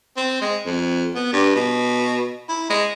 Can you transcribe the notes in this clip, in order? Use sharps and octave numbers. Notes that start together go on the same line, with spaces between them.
C4
G#3
F2
B3
G2
B2
E4
G#3